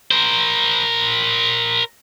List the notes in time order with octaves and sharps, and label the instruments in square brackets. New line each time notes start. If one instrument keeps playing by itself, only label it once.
[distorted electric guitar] A#4 C5